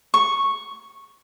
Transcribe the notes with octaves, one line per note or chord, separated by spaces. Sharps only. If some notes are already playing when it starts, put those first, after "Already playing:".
C#6